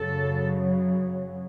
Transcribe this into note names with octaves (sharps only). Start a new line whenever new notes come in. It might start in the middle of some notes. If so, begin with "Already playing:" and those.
Already playing: F#2 C#3 F#3 A4